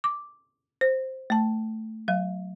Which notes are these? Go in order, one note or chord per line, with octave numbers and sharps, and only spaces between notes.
D6
C5
A3 A5
F#3 F5